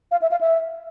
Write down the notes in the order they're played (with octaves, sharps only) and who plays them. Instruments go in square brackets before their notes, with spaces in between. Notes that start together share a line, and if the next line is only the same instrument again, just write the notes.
[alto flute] F5
E5
F5
E5